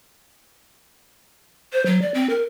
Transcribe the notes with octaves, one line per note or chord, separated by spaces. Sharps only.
C5
F#3
D5
C4
A#4